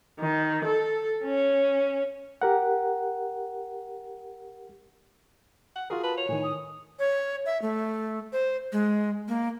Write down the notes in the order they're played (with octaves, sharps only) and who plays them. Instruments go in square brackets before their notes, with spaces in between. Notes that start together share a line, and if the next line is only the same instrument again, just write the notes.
[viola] D#3
A4
C#4
[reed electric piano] G4 A#4 F#5
[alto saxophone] F#5
[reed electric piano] F4 F#4 A#4 [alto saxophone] G#4
[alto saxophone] B4 [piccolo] A5
[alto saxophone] C#5 [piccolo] F7
[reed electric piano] A2 D#3 [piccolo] G#5
[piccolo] D#6
[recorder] C#5
E5
A3
C5
G#3
A#3